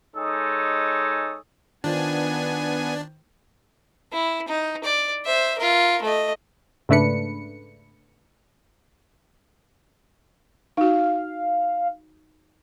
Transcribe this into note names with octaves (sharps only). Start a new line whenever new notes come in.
G#3 D#4 A4 C#5 G#5 D#6
D#3 B3 D4 F4 C5 G#5
E4
D#4
D5
C5 E5
F4 A#4
A3 D#5
G#2 C#3 A3 D4 B4 C#7
D#4 F#4 F5